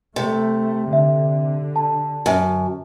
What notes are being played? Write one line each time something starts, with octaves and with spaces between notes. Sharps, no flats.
C3 A3
D3 E5
A5
F#2